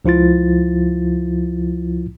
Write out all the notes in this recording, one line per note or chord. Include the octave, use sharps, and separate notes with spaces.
C#2 F3 E4 F4 A6